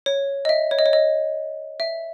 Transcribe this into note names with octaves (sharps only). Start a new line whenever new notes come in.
C#5
D#5
E5
C#5
D#5
C#5
D#5
E5